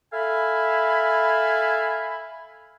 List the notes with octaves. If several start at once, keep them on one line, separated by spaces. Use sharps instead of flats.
A4 E5 F5 G#5 B5